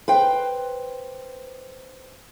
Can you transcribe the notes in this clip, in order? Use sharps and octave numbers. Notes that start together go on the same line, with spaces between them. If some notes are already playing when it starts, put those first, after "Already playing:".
B4 C5 G5